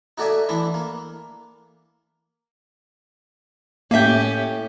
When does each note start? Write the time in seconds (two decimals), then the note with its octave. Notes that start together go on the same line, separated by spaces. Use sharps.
0.18 D#4 F#4 A4 D5 E5 G#5
0.49 E3 D4 E4
0.74 A#3
3.91 A2 A#3 C#4 G4 E5 G5